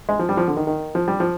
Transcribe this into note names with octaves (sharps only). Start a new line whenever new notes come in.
G#3
F3
G3
F3
D3
D#3
D#3
F3
G3
F3